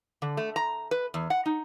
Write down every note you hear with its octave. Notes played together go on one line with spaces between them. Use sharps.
D3
A3
A#5
B4
E2
F#5
D#4